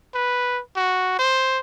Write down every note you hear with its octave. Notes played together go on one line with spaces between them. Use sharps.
B4
F#4
C5